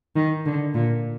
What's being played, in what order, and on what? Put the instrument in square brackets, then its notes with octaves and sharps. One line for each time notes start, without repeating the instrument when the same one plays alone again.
[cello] D#3
D3
A#2